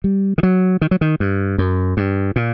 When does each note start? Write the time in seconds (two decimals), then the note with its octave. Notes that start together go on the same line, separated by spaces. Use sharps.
0.04 G3
0.38 D#3
0.43 F#3
0.81 D#3
0.91 F#3
1.01 D#3
1.20 G2
1.58 F#2
1.97 G2
2.36 A#2